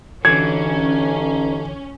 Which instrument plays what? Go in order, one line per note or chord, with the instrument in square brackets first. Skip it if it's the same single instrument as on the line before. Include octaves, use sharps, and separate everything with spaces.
[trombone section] G2 D#4 A4 [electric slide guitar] D3 E3 F#4 [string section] C#4 [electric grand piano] G#6